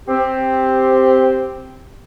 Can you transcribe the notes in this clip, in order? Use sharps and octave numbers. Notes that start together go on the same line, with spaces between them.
C4 G4